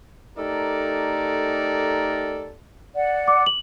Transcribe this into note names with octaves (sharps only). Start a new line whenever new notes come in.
A3 D#4 G4 A4 A#4 D5
D5 F#5
D6
F#7